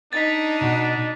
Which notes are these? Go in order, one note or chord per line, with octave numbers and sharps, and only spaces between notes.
D4 D#4 A6 B6
B2 F#4